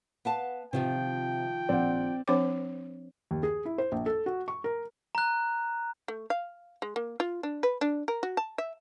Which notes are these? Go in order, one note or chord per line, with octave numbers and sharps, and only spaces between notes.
B3 F5 A5
C3 D#3 F3 F4 G5
A#1 C4 D5 F#5
F3 C4 D4 C5 C#5 D6
D#2
G#4
E4
C5
A#1
A4
F#4
C#6
A#4
A#5 F#6
A3
F5
G#3
A#3
F4
D4
B4
D4
A#4
F#4
A5
E5